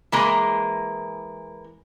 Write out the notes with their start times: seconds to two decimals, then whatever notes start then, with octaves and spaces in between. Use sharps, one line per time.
0.12 E3 G#3 A#3